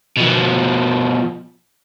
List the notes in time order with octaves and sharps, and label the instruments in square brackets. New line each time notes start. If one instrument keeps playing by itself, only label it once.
[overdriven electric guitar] B2 F3